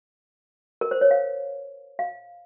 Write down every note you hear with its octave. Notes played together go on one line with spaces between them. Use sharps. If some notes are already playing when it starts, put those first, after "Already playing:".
A#4
C5
C#5
F5
F5